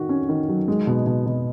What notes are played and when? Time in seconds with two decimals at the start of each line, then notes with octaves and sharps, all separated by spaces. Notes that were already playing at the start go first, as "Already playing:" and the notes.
Already playing: D#3 F#4
0.09 C#4
0.29 D#3
0.49 F#3
0.68 G#3
0.87 B2
1.07 B2
1.26 B2